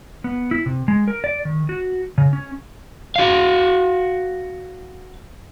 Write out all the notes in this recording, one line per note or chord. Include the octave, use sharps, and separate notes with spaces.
B3
E4
C3
G#3
A#4
D5
D#3
F#4
C#3
C#4
F#4 F5